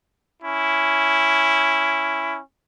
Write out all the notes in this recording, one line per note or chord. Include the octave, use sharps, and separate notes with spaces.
C#4 E4